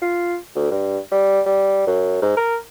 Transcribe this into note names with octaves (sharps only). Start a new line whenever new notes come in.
F4
D2
G2
G3
G3
F#2
G#2
A#4